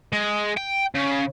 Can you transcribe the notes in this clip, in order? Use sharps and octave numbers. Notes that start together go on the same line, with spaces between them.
G#3
G5
C#3